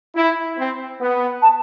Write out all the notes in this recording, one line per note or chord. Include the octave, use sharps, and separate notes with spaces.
E4
C4
B3
A5